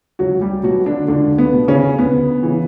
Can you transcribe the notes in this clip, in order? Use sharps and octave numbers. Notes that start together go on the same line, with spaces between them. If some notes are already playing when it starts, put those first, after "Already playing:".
C#2 F#3 F#4
G3 G4
B2 F#3 F#4
D3 D4
C#2 D3 D4
B3
B2
C#3 C#4
D2 B3
C#3 E3